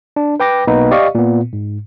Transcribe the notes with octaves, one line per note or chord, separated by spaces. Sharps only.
D4
B4 G5 D6 A#6
B1 B2 A#3 B3 D#4 B4
G4 D5 D#5 F5 C#6
A#2 B3
G#2